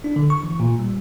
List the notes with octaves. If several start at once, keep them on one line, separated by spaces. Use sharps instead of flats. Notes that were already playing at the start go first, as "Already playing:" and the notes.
D4
D3
C#6
E3
A#2
G3